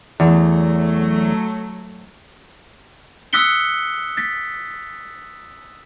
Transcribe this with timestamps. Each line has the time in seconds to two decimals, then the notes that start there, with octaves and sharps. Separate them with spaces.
0.20 E2 F#3 A3
3.33 D#6 E6 F#6 B6 C#7 G7
4.17 A6 B6